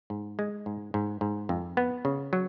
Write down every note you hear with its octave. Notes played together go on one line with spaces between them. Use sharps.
G#2
G#3
G#2
G#2
G#2
F2
B3
C#3
F#3